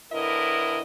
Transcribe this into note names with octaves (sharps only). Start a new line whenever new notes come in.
A2 D3 E4 A#4 B4 D#5